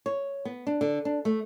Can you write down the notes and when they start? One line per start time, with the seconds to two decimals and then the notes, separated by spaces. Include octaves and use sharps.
0.06 C#5
0.45 B3
0.67 D4
0.81 D3
1.05 D4
1.25 A3